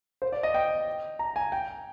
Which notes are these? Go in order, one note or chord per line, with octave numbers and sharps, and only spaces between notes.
C5
D5
D#5
G5
A#5
G#5
G5